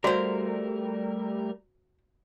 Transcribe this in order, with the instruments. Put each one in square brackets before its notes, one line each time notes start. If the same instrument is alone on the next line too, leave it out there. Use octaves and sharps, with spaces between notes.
[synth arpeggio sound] G3 [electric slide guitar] A3 A#4 [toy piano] F#4 F5 [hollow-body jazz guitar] C5 D5